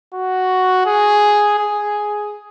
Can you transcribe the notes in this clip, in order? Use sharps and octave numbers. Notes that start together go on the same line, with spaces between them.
F#4
G#4
G#4